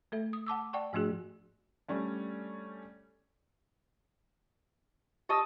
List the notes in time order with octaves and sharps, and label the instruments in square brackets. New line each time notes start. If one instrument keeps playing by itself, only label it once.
[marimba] A3 A4 E5
D#6
F#5 A5 D6 E6
D5 F#5 G5 A5 C#6
G#2 F3 A3 D4 F#4 G#4
[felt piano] G3 A3 C#4 D4
[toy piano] G4 D#6 [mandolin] D#5 A5 E6